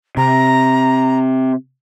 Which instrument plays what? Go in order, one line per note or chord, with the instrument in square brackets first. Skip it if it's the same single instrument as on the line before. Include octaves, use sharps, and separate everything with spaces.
[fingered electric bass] C3 [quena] A#5